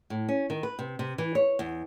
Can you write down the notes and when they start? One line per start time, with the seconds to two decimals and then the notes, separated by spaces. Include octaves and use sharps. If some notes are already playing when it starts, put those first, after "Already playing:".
0.10 A2
0.29 C#4
0.50 D#3
0.63 B4
0.79 C3
0.99 C3
1.18 E3
1.35 C#5
1.59 E2